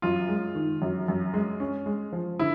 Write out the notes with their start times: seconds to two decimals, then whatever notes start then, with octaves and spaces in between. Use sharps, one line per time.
0.02 F#2 F4
0.29 G#3
0.55 D#3
0.82 F#2
1.08 F#2
1.34 G#3
1.60 C#4
1.86 G#3
2.13 F3
2.39 D3 E4